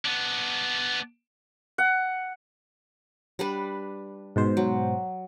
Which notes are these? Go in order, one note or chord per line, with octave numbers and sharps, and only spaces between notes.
B3 D4
F#5
G3 D4 B4
G#2 B2 C5
F#3